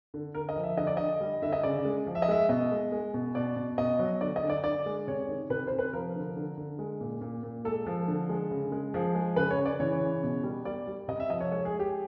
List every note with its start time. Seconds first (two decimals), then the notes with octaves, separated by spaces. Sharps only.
0.14 D3
0.34 D3 A#4
0.49 D#5
0.56 F3
0.63 E5
0.77 D3 D#5
0.87 D5
0.97 D3 D#5
1.21 G3
1.42 D3 E5
1.53 D#5
1.63 C#3 D5
1.85 G#3
2.07 F3
2.15 E5
2.22 D#5
2.28 G#3 E5
2.49 B2 D#5
2.72 G#3
2.92 G#3
3.14 B2
3.35 B2 D5
3.56 B2
3.78 B2 D#5
3.99 F#3
4.21 D3 D5
4.36 D#5
4.43 D3
4.50 D5
4.64 D3 D5
4.86 G#3
5.07 C3 C#5
5.28 D#3
5.50 C3 B4
5.67 C3 C5
5.79 B4
5.93 F3 A#4
6.15 D3
6.36 D3
6.57 D3
6.79 G#3
7.01 A#2
7.21 A#2
7.43 A#2
7.64 G#3 A4
7.87 F3
8.08 D3
8.29 G#3
8.51 C#3
8.72 G#3
8.94 F3 G#4
9.15 G#3
9.36 C#3 B4
9.50 C#5
9.58 C#3
9.65 D5
9.80 E3 C#5
10.01 C#3
10.23 B2
10.44 G3
10.65 G3 D5
10.87 G3
11.08 C3 D#5
11.20 E5
11.29 F3 D#5
11.40 C#5
11.51 G#3 C#5
11.65 G#4
11.72 G#3
11.80 G4